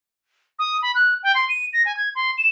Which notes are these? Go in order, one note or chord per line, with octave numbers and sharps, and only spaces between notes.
D#6
B5
F#6
G5
C6
D#7
A#6
G#5
G#6
C6
E7